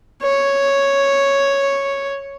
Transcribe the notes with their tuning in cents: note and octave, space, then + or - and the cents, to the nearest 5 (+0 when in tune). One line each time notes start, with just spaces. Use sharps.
C#5 +0